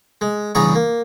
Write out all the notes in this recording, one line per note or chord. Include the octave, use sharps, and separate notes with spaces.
G#3
E2 G2 C#3 G#4 A#5 C#6
A#3